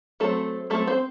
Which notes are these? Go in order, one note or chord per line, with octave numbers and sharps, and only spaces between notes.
F#3 A3 C4 A4
F#3 A3 C4 A4
C4 C5